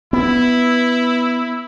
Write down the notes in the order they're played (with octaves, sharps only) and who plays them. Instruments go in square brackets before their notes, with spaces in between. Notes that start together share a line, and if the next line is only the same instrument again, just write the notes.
[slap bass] B3 [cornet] E4